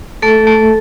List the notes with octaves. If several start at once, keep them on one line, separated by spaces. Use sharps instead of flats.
A3 A4
A3